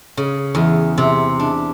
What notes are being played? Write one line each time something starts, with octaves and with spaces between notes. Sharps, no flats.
C#3
E2
C3
D4